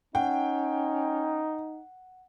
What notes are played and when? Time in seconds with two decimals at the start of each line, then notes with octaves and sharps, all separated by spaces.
0.15 C#4 D#4 F#5 G5